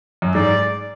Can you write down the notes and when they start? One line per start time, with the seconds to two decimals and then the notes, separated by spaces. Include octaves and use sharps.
0.22 F#2
0.35 G#2 D5